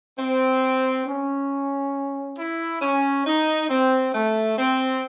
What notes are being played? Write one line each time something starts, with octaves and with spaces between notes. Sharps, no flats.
C4
C#4
E4
C#4
D#4
C4
A3
C4